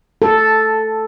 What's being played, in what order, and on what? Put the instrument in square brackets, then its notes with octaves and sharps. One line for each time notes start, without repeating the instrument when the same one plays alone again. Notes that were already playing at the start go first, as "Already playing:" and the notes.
[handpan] A4